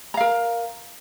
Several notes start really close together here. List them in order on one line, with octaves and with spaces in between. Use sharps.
A#5 F5 A#4